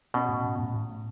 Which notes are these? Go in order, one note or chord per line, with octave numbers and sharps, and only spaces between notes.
B2 C#4
A2
A2
A2
A2
A2